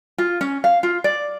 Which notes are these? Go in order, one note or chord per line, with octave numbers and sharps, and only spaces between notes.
F4
C#4
F5
F4
D5